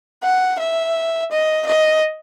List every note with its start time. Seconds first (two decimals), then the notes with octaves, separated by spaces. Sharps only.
0.23 F#5
0.59 E5
1.31 D#5
1.66 D#5